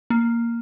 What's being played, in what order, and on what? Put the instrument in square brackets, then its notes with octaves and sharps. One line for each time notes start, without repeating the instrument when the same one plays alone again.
[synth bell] A#3